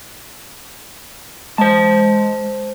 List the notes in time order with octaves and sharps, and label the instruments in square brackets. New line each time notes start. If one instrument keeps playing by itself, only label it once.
[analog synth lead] G#3 [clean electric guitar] C5 A5